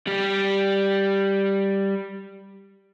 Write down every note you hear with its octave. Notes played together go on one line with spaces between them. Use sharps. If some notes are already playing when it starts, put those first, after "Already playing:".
G3 G4